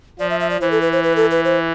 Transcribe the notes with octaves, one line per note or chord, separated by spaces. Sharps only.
F3 D5
E5
E5
D5
E3 C5
A4
B4
C5
B4
A4
B4
C5